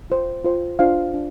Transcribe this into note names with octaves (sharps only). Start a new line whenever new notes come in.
F4 C5
F4 C5
D4 F4 C5 F5
D4